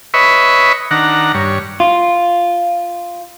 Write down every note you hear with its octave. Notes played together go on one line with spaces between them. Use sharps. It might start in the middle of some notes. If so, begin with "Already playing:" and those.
B4 C#5 D#5 E5 B5 C#6
D#3 D4 F#5 A#5
G2 C#5
F4